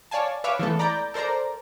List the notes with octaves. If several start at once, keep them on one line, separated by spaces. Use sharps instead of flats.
C#5 D5 F5 G#5 A5
B4 C#5 E5 F5 D6 F6
E3 G#3 A3 B3 A4
D5 A#5 B5 D6 G6 A6
A4 A#4 C5 D5 A#5